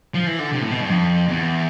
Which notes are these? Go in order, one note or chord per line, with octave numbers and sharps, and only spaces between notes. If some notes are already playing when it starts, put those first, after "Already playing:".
F3
E3
D3
C3
A2
B2
G2
F2
E2